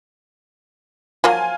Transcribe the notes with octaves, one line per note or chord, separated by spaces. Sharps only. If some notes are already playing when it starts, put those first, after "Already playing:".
F3 F#3 A#3 F4 G#5